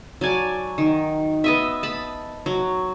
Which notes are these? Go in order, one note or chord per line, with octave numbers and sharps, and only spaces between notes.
F#3 D5 G#5 A5
D#3
B3 D#5 E5
A5 B5
F#3